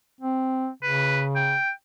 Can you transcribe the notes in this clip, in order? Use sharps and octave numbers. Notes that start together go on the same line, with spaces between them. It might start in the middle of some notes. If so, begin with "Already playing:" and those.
C4
C#3 B4
G5